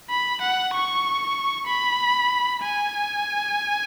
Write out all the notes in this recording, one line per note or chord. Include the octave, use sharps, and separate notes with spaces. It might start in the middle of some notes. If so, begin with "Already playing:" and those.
B5
F#5
C#6
B5
G#5